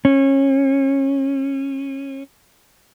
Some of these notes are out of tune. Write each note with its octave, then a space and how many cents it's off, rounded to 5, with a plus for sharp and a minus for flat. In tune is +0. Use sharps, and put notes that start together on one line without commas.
C#4 -25